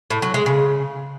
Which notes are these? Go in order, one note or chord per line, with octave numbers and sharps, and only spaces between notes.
A2
F#3
G#3
C#3